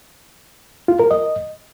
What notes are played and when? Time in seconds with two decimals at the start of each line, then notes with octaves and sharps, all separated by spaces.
0.88 F4
1.00 A#4
1.11 D#5